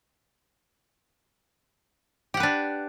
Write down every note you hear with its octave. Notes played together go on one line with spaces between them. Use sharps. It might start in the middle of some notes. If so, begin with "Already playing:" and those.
D4 G4 B4 F#5